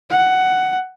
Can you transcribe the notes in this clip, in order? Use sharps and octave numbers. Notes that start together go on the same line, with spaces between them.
F#5